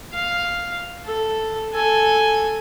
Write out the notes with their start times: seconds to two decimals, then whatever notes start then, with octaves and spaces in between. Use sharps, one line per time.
0.13 F5
1.05 A4
1.73 A4 G#5